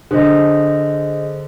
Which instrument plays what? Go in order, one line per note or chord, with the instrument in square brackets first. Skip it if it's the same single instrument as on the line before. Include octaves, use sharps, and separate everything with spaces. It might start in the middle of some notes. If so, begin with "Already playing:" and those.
[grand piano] D3 [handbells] G#4 C5 D#5